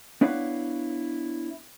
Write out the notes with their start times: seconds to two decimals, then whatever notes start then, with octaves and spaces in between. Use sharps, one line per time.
0.21 B3 D4 E4 B4 C#5 F5